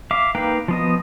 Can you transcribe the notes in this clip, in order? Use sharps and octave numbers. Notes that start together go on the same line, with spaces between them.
E5 F5 D6
A#3 D#4 B4 F5 G5
F3 B3 D#5